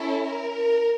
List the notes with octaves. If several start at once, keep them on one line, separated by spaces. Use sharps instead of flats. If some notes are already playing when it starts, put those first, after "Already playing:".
Already playing: C#4 E4 A4
A#4